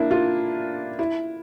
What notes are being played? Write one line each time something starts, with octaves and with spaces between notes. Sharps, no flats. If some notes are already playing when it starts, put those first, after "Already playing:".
Already playing: A#3 D4 E4
F4
E4